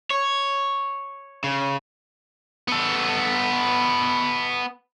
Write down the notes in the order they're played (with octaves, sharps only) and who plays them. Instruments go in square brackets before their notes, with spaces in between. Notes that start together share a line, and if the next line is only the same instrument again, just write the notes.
[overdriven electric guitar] C#5
C#3
[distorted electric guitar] B3 A4